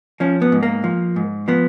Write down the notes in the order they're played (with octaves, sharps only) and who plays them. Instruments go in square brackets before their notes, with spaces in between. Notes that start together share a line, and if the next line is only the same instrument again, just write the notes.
[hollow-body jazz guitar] F3 C#4
B3
G#2
A#3
F3
G#2
F3 B3